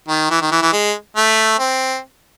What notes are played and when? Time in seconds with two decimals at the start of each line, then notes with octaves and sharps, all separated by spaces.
0.08 D#3
0.30 E3
0.41 D#3
0.51 E3
0.62 E3
0.73 G#3
1.17 A3
1.59 C4